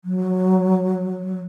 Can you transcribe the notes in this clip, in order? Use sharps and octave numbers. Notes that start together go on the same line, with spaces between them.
F#3